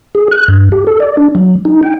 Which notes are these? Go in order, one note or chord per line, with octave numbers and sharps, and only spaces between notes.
G#4
F#6
G2
G4
A4
D5
D4
F#3
D#4
G5